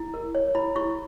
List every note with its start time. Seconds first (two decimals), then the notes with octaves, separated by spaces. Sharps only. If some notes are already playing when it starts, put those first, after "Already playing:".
Already playing: E4
0.14 A#4
0.35 C#5
0.55 E4 B5
0.76 E4 C#6